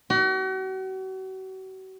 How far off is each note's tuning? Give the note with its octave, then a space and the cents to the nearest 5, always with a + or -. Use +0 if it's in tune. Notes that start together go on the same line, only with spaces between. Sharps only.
F#4 +40